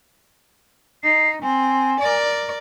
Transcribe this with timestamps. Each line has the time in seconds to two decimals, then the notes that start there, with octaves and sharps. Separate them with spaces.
1.03 D#4 C7
1.42 C4 G#5
2.00 A#4 D5